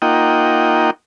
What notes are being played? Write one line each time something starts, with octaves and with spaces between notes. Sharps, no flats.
A#3 D#4 F4 D#5 F#5 G5